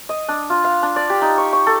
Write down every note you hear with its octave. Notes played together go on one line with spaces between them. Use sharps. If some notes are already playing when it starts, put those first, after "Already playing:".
D#5
D4
F4
F5
D4
D5
G4
D#4
C#6
C#6
A4